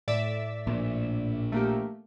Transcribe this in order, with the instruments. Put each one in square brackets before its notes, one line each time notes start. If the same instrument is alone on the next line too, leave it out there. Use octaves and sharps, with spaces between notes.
[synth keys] A2 D5 E5
[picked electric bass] A#1
[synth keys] A3 A#3 G4